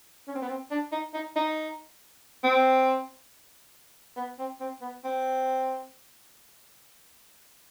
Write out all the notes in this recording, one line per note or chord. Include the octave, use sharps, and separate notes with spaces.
C#4
C4
B3
C4
D4
D#4
D#4
D#4
C4
B3
C4
C4
B3
C4